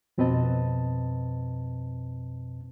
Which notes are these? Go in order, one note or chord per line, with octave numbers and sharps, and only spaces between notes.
F2 B2 C4 B4 D#5 A5